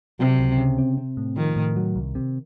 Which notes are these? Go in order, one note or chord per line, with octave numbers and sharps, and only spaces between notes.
C3 F#3
C#2
C#3
C4
C4
A2
D#3 F3
A2
F#3
C2
C3